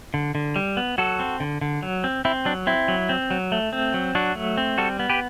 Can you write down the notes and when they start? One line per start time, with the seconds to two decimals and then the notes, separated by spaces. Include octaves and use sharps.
0.14 D3
0.35 D3
0.56 G3
0.77 B3
0.98 F#3 F#4 A4
1.19 C4
1.40 D3
1.61 D3
1.83 F#3
2.04 C4
2.25 C4 E4
2.45 F#3 D4
2.67 C4 E4
2.88 F#3
3.09 C4
3.31 F#3
3.52 A3
3.73 C4
3.94 F#3
4.15 F#3 D4 F#4
4.35 A3
4.58 C4
4.78 G3 F#4 A4
4.99 B3
5.10 G4 B4